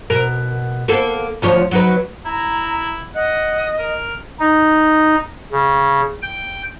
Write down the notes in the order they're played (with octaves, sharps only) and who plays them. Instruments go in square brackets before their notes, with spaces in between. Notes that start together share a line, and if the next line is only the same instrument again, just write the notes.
[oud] B2 A#4
A#3 B3 A4
D2 F3 C#5
F#3 D#4 B4
[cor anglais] E4 [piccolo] A#5
[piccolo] D#5 [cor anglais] F#5
[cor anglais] A#4
[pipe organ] D#4
C#3
G5